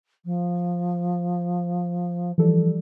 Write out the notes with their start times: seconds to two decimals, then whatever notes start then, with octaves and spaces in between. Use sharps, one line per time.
0.25 F3
2.38 E3 F3 G3 A4